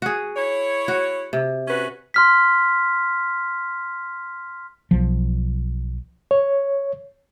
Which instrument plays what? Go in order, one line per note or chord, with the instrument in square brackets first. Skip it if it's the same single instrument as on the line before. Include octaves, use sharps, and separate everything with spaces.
[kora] F#4 G#4
[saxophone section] E4 C#5
[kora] F#4
C3
[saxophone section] C#4 F#4 B4
[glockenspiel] C6 F6 B6
[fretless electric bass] B1 F3
[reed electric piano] C#5